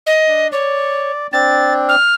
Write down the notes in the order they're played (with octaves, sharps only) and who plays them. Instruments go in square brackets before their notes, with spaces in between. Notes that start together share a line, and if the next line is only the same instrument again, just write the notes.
[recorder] D#5
[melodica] D4
[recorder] C#5 [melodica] D5
[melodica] C4 D4 [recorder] A6
[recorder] F6